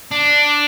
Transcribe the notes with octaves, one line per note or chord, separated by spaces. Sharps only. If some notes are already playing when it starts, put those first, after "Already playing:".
D4